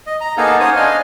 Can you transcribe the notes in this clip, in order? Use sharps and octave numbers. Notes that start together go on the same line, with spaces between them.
D#5
A#5
A#3 B3 D#4 G#4 A4 F5
C#4 C5 C#5 D#6
D4 D#5 F5 G#5